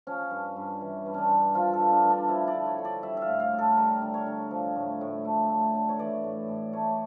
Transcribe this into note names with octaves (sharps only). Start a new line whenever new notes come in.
F3 C#4
G2
G2
E3
G2
C#4 D4
G2
F3 F4
A4
G2
D4
G2
D4
F3 E4
D5
D3
C#5
D3
D5
G3 E5
E5 F5
A2
F5
A2
A4
G3 A#4
D3
C#5
D3
F3
A2
A2
A3
A3
D3
C#5
E3 D5
A2
A2
A3 C#5